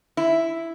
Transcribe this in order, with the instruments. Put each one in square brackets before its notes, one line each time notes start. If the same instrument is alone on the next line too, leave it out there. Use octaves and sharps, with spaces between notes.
[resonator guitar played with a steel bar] E4